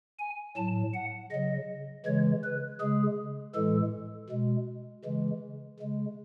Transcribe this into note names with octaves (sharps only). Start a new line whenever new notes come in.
G#5
A2 F#3 A5
F#5
C#3 F#3 D#5
C#3 E3 G#3 C#5
B4
C#3 G#3 G#4
A2 E3 G#3 A4
B2 G#3
C#3 E3 G#3
C#3 G#3